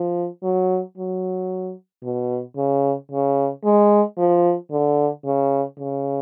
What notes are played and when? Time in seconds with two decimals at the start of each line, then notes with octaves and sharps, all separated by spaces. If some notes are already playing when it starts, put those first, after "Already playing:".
Already playing: F3
0.43 F#3
0.97 F#3
2.03 B2
2.57 C#3
3.12 C#3
3.65 G#3
4.18 F3
4.72 D3
5.25 C#3
5.79 C#3